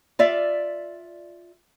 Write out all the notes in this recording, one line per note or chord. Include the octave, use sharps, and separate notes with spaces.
F4 D5 E5